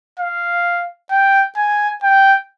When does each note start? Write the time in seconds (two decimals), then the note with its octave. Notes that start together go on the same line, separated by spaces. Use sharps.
0.19 F5
1.11 G5
1.57 G#5
2.03 G5